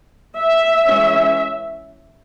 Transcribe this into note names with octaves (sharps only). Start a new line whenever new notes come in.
E5
E3 G#3 C#4